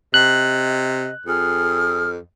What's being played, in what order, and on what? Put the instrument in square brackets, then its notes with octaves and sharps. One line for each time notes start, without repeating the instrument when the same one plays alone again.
[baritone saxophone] C3 [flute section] D#5 [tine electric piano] F#6
[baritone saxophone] F2 [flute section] G#4 D#6 F6